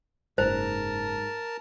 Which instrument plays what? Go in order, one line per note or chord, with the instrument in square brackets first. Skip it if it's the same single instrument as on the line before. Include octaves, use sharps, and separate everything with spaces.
[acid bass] F#1 [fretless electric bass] G#2 [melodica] A#4 A5 [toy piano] C5